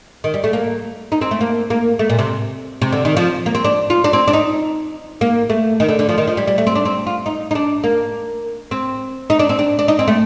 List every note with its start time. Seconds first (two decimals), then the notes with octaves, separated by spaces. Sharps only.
0.24 D#3
0.34 G3
0.44 A3
0.53 A#3
1.12 D#4
1.21 C4
1.31 A3
1.41 A#3
1.70 A#3
1.99 A3
2.10 A#2
2.19 C3
2.82 C3
2.92 D3
3.05 D#3
3.17 F3
3.46 A#3
3.55 C4
3.64 D4
3.90 F4
4.04 D4
4.13 C4
4.28 D4
4.33 D#4
5.21 A#3
5.50 A3
5.80 D#3
5.89 D3
5.99 D3
6.09 F3
6.18 D#3
6.27 F3
6.37 G3
6.47 G3
6.58 A3
6.67 C4
6.76 D4
6.85 C4
7.07 F4
7.26 D#4
7.51 D#4
7.55 D4
7.84 A#3
8.71 C4
9.30 D#4
9.39 D4
9.49 C4
9.59 D4
9.79 D4
9.88 D#4
9.99 C4
10.08 A3